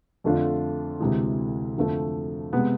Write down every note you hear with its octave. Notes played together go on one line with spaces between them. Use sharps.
F2 D3 A3 D4 F4
D2 C3 E3 G#3
F2 D3 F3 A3
C3 G#3 B3